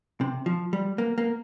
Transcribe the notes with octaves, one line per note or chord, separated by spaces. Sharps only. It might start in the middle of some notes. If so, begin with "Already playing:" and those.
C3
F3
G3
A#3
A#3